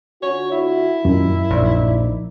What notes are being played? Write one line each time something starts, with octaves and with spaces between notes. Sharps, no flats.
D3 F4 F#4 C#5
E4
F#2 A#2 D#3
A#1 D#4 D5